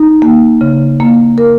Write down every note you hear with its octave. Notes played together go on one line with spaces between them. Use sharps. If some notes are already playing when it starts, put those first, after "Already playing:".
Already playing: D#4
A#3
C#3
A#3
A#4